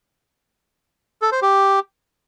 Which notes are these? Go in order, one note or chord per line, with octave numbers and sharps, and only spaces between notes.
A4
C5
G4